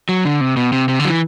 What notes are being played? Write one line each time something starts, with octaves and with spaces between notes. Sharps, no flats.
F#3
D3
C3
B2
C3
C3
D3
F#3
E3